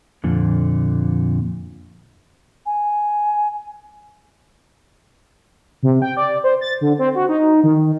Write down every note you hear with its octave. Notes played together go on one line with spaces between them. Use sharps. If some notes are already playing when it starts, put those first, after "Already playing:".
F2 A#2 D3
G#5
C3
G5
D5
C5
A6
D3
C4
F#4
D#4
D#3